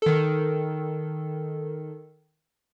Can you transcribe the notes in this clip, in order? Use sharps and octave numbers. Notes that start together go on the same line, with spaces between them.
D#3 A4